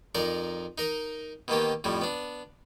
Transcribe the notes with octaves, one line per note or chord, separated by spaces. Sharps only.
F2 D#4 A#4 D5
D#4 A#4 D#5
B2 D#3 A#3 G4
F2 A2 G3
B3 D4